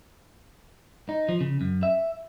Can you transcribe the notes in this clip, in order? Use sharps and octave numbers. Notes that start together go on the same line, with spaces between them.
D#4
F3
C#3
F#2
E5